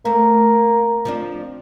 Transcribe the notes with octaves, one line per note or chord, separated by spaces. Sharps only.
A3 A#3 C4
F3 C4 D4